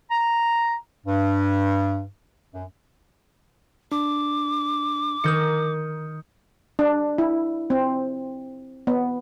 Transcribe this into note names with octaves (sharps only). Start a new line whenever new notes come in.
A#5
G2
F#2
D4 D6
D#3 A#4 D#6 G6 C#7
D4
E4
C4
B3